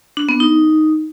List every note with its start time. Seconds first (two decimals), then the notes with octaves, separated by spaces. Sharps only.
0.17 D4
0.29 B3
0.40 D#4